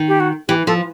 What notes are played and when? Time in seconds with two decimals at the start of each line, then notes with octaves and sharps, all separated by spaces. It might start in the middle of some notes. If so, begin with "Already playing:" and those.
Already playing: D#3
0.08 G4
0.20 F#4
0.48 E3 G4
0.67 F3 A4